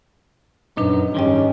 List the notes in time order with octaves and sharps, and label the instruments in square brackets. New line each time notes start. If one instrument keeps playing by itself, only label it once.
[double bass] F#2 [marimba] A#2 D4 B4 [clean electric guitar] D#4
[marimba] G#2 G3 D#5 [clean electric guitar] D#3 G4 [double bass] C#4